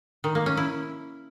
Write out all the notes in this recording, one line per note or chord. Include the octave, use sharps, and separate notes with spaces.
D#3
A#3
C#4
E4